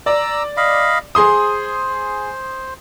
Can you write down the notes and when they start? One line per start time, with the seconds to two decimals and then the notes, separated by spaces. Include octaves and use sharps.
0.06 D5 A#5 E6
0.57 D#5 F5 B5
1.15 G#4 C5 C6 D#6